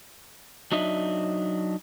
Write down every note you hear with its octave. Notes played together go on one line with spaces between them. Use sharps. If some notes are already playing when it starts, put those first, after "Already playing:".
F#3 D4 D#4 D#5 E5